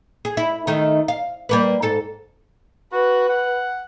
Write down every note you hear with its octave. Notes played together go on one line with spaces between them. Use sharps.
G#4
E4
D#3 A3 D#4
F5
G3 A#3 B4
G#2 A4
F#4 B4
F#5